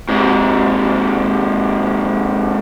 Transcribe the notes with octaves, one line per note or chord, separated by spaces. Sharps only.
G#2 C3